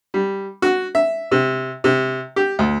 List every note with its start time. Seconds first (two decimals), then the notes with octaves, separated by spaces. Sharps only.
0.14 G3
0.62 F#4
0.95 E5
1.32 C3
1.84 C3
2.36 G4
2.59 D2